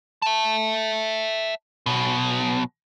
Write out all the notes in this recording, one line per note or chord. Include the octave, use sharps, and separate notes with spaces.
E5 A5
B1 B2